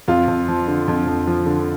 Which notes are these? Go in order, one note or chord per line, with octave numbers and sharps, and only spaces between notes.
F2 F4
F2
F3
D3
F2
F2
F3
D3